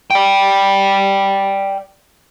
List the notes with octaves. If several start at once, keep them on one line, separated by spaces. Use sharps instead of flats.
D5 G5